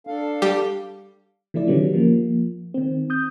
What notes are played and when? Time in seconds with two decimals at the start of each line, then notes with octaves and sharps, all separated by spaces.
0.07 D4 A4 F5
0.42 G3 G4
1.54 E3 F3 A3 E4 D5
1.68 D3 D#3 F#3 G3 B3 C#4
1.94 F3 A#3
2.74 D#3 C4
3.10 D#6 G6